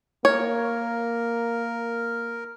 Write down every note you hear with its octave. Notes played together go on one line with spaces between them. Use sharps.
A#3 A#4 C#5